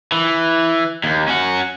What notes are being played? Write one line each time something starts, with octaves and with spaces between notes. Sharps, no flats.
E3
D#2
C#4 F#4